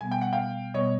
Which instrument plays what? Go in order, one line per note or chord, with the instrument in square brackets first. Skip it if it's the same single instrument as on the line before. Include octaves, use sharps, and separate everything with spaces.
[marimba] B2 G3 B3 [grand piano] G#5
[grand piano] G5
F#5
F5 G5
[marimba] B2 G3 B3 [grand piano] C#5 D#5